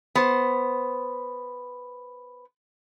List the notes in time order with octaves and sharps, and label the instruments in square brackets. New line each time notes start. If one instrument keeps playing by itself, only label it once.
[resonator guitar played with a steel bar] B3 C5